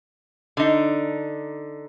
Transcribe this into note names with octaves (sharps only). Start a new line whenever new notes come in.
D3 D#4